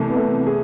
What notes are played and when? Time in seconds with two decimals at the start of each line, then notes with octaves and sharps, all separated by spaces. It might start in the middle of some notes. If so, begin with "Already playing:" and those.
Already playing: C2 C3 E3 A3
0.10 B3
0.16 A3
0.47 G#4